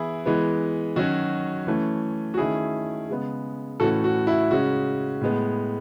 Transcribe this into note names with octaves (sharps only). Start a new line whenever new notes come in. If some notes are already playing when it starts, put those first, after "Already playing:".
Already playing: E3 B3 E4 G#4
E3 G#3 B3
D#3 F#3 C#4 F#4
E3 A3 C#4
F#4
D#3 A3 C#4 E4 G#4
C#3 G#3 B3
A2 E3 A3 C#4 F#4 A4
F#4
E4
C#3 G#3 C#4 F#4
A2 G#3 B3